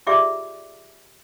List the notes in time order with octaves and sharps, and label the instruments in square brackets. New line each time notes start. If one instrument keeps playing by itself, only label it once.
[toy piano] F4 G4 G#4 D5 E5 D6